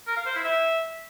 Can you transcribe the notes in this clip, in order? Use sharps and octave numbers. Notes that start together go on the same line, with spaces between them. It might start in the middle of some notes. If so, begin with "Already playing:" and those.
A#4
F5
C5
E4
E5